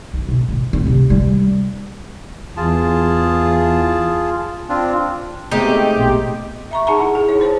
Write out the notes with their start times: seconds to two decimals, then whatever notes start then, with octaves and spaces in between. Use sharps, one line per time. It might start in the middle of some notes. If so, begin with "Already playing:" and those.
0.14 B1
0.29 B2
0.48 A1
0.73 C4
0.87 C3
1.10 G3
2.56 E2 F4 G#4 A5
4.69 C4 D4 F4
5.51 G#3 A3 B3 C4 D#4 G4
5.96 A#1 B2 C6
6.71 E5 A#5 C#6
6.87 D#4 G#4 F#5 A5 A#5 C#6
7.00 E4
7.15 G#4
7.29 D#4 C#5
7.41 C5 C#5 A5